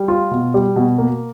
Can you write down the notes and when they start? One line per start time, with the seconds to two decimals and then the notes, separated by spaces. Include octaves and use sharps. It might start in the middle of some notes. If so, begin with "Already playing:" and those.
Already playing: G3
0.08 F4
0.31 B2
0.54 G3
0.76 B2
0.98 A#3